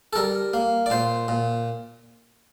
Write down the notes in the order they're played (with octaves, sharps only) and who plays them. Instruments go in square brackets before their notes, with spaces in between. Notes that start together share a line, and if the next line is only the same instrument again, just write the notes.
[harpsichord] A4
G3 A#4
A#3
D5
A#2 C5
A#2